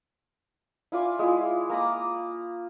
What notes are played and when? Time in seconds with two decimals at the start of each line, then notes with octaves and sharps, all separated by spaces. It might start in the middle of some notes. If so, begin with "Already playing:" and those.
0.92 E4 F4 D5 G#5
1.19 G#3 E4 F4
1.70 A#3 A#5 B5 D#6